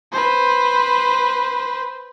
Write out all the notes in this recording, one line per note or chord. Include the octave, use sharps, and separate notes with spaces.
B4 C5